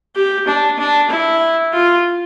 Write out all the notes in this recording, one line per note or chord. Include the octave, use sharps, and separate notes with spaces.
G4
D4
D4
E4
F4